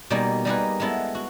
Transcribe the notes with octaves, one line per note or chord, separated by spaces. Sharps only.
B2 G3 A#3 D#4 G#4
G3 A#3 D#4 G#4 B4
G#3 B3 E4 A4
F#4